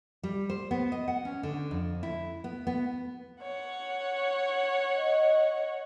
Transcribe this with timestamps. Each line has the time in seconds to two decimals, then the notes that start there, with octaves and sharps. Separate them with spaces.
0.23 G3
0.50 C5
0.71 B3
0.92 D#5
1.08 F#5
1.25 C#4
1.43 D3
1.71 F2
2.03 E4
2.44 B3
2.67 B3
3.42 C#5 F#5
4.96 D#5